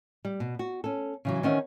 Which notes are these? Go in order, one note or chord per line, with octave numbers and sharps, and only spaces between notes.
G3
B2
F#4
C#4 A4
C#3 E3 F#3
D#3 E3 C#4 C5 E5 F#5